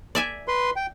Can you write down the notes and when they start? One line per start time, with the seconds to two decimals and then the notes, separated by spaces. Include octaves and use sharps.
0.15 D5 E5 G#5
0.48 B4 C6
0.76 G5